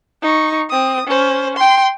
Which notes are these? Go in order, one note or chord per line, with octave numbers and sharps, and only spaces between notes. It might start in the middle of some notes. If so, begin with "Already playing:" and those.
D#4 C#6
C4 D#6
C#4 C5
G5 C6